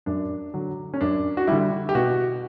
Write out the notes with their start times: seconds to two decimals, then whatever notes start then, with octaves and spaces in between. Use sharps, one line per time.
0.06 F#2 D4
0.54 D3 F#3
0.94 C#4
1.01 F#2 D4
1.37 F#4
1.47 D3 G3 E4
1.89 G4
1.95 B2 F#4